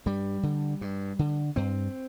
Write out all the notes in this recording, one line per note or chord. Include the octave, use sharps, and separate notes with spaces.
G2 G3
D3
G2
D3
G2 C4